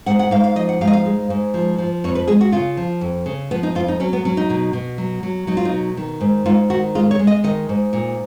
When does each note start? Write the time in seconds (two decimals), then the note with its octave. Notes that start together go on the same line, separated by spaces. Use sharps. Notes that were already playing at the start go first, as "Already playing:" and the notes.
0.06 G#2 F#5
0.19 F#5
0.31 G#2 F5
0.44 F5
0.55 F3 D#5
0.69 F#5
0.81 G#2 F5
0.87 D#5
0.93 F5
1.06 G#3
1.30 G#2
1.54 F3
1.78 F3
2.04 F2 C#5
2.15 B4
2.28 G#3 G#4
2.41 F#4
2.52 C#3 F4
2.77 F3
3.01 F2
3.26 C#3
3.51 F3 B3
3.63 D#4
3.75 F2 F4
3.88 D#4
4.00 F#3 C#4
4.13 B3
4.25 F#3 C#4
4.37 D#4
4.50 B2
4.73 B2
4.98 F#3
5.23 F#3
5.47 F#3 D#4
5.57 F4
5.65 D#4
5.72 B2
5.97 D#3
6.21 G#2
6.46 G#2 F4
6.70 D#3 F#4
6.95 G#3 F4
7.11 C#5
7.19 G#3
7.27 D#5
7.44 D#3 D#5
7.69 G#2
7.93 A#2